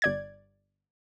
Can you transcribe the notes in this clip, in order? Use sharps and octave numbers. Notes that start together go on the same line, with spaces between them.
G1 D5 G#6